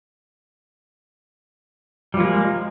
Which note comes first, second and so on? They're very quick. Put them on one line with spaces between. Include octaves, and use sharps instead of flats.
G3 F3 A#3 G#3